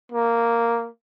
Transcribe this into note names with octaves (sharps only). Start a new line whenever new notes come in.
A#3